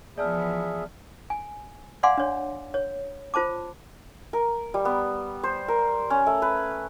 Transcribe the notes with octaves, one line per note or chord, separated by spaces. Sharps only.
E3 F3 B3 G#4 D5 E5 A5 F6
G#5
D5 F5 F#5 G#5 C6 D6
D4 C#5
C#5
F4 C5 A5 D6
A#4
G3
B3
C5
A#4
C#4
A3
B4